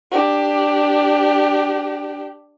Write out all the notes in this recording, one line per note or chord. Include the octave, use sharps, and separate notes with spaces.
D4 G4